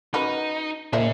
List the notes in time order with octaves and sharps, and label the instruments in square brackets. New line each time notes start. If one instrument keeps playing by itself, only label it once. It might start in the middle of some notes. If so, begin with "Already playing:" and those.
[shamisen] C#4 F#4 B4 [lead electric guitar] D#4
[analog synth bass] A#2 [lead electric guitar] C#4 G#4 [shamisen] C5 D#5 E5